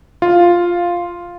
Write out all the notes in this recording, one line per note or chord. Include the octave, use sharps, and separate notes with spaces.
F4